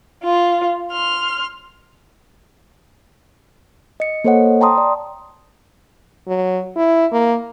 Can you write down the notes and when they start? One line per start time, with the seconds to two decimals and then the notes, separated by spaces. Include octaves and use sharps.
0.23 F4
0.92 C6 F6
4.00 D#5 C#7
4.24 A#3 A4 C5 C#5 D#5 F#5
4.61 G5 A5 A#5 C6 D#6
4.78 D5
6.27 F#3
6.76 E4
7.12 A#3